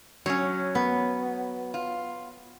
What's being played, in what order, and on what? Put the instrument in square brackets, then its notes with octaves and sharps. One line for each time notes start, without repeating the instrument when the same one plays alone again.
[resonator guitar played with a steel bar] F#3 C#4 [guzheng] C#5
[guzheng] B3
[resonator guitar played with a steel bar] F4